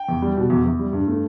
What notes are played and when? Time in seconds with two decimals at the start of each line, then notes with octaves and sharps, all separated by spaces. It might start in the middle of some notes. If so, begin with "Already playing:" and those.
Already playing: G5
0.09 E2
0.22 G3
0.37 B2
0.50 E2
0.64 E2
0.79 G3
0.93 G2
1.08 A3